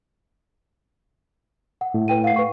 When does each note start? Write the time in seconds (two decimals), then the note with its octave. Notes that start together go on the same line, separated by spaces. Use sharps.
1.81 F#5
1.94 A2
2.08 B4 G5 D#7
2.24 F5 F#5 C7
2.36 B4 C#6